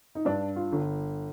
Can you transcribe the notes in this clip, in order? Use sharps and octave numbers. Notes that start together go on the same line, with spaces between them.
D#4
G2 D4
F4
G1